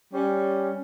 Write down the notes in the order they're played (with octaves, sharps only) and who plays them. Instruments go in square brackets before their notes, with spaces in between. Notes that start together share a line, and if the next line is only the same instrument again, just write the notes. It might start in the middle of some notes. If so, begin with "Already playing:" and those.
[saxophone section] G3 C#4